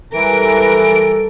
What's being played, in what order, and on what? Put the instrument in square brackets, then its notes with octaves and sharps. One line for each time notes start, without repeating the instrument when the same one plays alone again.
[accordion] E3 [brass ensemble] G3 A4 [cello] A#4 [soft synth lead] D7